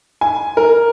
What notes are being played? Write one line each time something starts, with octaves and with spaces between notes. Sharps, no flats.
G#5
A#4